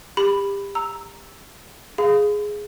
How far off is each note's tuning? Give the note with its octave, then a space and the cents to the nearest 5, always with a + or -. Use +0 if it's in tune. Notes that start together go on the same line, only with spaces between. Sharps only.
G4 +30 B5 +0
A#5 +0 E6 +0
G#4 +0 F5 +0 B5 +45